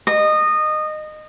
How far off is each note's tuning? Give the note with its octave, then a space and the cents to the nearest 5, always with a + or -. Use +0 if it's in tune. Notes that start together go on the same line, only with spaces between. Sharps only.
D#5 -20